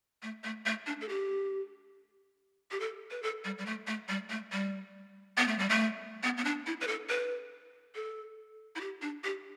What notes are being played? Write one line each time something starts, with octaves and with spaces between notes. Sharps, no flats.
A3
A3
A3
D4
A4
G4
G4
A4
B4
A4
G3
G3
A3
A3
G3
A3
G3
B3
A3
G3
A3
B3
B3
D4
E4
B4
A4
B4
A4
E4
G4
D4
G4